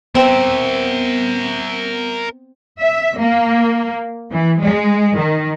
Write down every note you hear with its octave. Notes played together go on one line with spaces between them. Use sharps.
B3 C4 A#4 E5
E5
A#3
E3
G#3
D#3